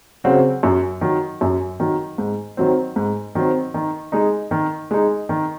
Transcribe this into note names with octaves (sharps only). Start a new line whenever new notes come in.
C#3 F#3 C4 F#4
F#2
D#3 F#3
F#2
D#3 F#3
G#2
D#3 F#3 C4
G#2
D#3 F#3 C4
D#3
G#3 D#4
D#3
G#3 D#4
D#3